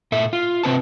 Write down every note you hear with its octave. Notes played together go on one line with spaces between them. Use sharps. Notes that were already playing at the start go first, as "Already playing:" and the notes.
A#2 A4 E5
F4
C3 C4 B4 A5